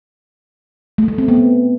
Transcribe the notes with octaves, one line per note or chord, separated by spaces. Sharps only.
A3
A3
C4
B3